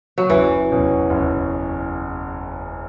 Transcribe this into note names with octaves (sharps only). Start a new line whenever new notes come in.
F#3
F#1 E3
E2 B2 F#3 C#4
F#1